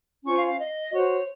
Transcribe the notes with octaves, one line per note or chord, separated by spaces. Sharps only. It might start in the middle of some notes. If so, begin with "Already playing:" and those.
C#4 F4 C5 C#6
F5
F5
D#5
F#4 C5 C#5